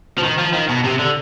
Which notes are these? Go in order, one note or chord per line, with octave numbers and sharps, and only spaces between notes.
F3
D#3
F3
D#3
B2
C3
D3